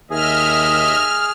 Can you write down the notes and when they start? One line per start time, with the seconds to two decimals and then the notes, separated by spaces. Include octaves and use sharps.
0.11 D#2 G#4 D#5 E5 F6